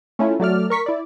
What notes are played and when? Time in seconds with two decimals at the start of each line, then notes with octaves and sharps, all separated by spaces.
0.19 A3 C#4 E4 F4
0.40 F#3 A3 D5 F6
0.70 A#4 C#6 B6
0.86 E4 D5